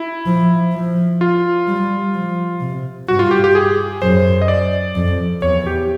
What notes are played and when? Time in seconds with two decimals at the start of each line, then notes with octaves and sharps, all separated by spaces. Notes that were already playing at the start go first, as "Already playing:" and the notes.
Already playing: E4
0.26 F3
0.73 F3
1.21 F4
1.67 G3
2.14 F3
2.61 C3
3.08 G2 F#4
3.19 F4
3.31 G4
3.44 G4
3.55 G#4
4.02 F#2 C5
4.42 D#5
4.48 D5
4.96 F2
5.42 E2 C#5
5.66 G4